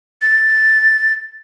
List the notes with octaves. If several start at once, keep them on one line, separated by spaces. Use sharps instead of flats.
A6